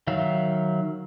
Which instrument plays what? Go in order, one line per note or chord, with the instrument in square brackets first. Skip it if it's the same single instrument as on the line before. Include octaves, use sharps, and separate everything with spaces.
[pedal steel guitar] D#3 F#3 E5 F5